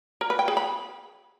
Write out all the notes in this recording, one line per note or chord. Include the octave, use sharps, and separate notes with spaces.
A#4
B4
G5
G#4
B5